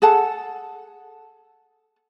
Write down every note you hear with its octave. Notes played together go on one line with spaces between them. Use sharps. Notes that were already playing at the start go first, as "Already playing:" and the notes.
G#4 A4 F#5 A5